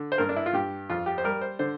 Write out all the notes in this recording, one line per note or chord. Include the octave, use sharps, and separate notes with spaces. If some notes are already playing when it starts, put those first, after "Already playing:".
Already playing: D3
C5
G2 A#4
D4
E4
F4
G2 G4
F2 F4
G4
C5
G3 A#4
C5
D3 C5